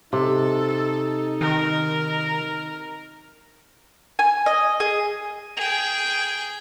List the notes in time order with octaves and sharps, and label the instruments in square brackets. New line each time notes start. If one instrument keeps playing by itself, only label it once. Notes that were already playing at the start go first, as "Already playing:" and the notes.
[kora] C3 [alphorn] D#4 [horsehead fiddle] A4
[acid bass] D#3 [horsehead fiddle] A#4
[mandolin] G#5
D#5
G#4
[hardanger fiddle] G#4 G5